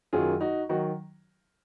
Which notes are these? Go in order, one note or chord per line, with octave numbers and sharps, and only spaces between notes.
F#2 D#3 F#3 F4 G#4
D#4 F#4
D#3 F#3 D#4 F#4